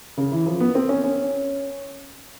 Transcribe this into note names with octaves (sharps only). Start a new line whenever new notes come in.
C#3
E3
F3
B3
C4
C#4
C#4